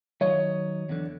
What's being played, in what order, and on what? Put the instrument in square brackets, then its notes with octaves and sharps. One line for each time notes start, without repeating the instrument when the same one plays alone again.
[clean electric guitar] D#3 F#3 D#5 [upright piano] C#5
[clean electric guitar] E2 D3